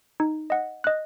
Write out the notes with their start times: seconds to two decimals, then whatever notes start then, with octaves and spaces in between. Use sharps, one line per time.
0.20 D#4
0.50 D#5 F#5
0.84 D#5 F#6